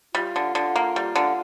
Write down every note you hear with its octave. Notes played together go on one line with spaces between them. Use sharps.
G3 F4
D3
D3
A#3
G3
D3